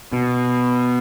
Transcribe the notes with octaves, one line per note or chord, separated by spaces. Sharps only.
B2